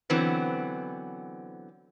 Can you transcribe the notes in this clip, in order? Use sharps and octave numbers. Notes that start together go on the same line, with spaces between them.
D3 E3 F#3 B3 C4